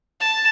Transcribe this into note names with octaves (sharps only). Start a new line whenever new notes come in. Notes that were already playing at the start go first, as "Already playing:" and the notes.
A5